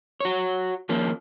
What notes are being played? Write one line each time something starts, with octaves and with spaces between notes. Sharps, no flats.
F#4 C#5
D#2 F3 A#3 C#4